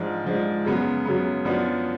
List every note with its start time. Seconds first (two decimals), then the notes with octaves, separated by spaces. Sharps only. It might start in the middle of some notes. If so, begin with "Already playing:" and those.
Already playing: G#2 F3 G#3 D4
0.25 G#2 F3 G#3 D4
0.65 F#2 C#3 F#3 B3
1.05 F#2 C#3 F#3 B3
1.45 F#2 F3 B3 D4